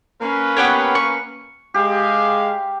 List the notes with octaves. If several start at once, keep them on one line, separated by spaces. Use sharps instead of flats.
A#3 C#4 B4
B3 G4 C#5
C#6
G#3 G4 F5